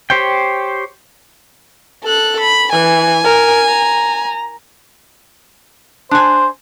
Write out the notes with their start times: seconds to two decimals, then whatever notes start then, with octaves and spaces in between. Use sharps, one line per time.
0.10 G4 C5 C#5 G5
2.04 A4 F#6
2.40 B5
2.72 E3 G#5
3.24 A#4
3.68 A#5
6.11 D4 C5 G#5